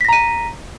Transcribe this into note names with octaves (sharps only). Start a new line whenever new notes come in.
A#5 A#6 B6 D#7